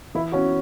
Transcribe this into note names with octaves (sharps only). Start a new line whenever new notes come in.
E3 E4
C#4 F#4